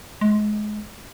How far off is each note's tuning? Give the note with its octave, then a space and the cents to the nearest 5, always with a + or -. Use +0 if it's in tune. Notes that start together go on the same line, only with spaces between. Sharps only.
G#3 +25